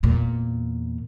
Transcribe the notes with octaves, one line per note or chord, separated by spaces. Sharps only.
E2 A#2